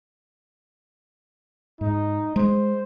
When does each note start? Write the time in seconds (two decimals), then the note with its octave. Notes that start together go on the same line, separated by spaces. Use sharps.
1.81 G#2 D#4
2.36 G#3 C5